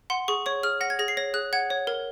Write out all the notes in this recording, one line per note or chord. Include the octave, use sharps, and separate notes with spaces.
F#5 C6
G#4 C#6
C#5 C#6
G#4 F6
F#5 A#6
G#6
G#4 A#6
C7
C#5 A#6
G#4 F#6
F#5 G#6
C#5
A#4